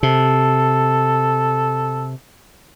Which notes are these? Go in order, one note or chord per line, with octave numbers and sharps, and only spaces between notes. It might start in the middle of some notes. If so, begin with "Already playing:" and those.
C3 A4